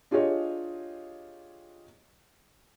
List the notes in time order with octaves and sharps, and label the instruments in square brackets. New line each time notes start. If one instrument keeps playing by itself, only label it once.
[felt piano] D4 F4 G4 G#4 C#5 D#5